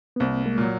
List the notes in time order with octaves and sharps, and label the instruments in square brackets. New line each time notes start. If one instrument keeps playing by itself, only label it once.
[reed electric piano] B3
[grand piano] C2 [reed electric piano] A#3 C4
[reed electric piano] G#3 A#3
[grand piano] A#2 F#3